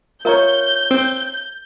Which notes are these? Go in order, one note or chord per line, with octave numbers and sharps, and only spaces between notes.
F4 A#4 C#5 E5 A#5 G6
C4